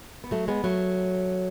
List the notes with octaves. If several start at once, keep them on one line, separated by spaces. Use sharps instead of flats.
B3
F#3 A3
G#3 B3
F#3 A3